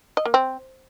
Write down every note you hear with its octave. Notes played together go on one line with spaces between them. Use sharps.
D#5
A#3
C4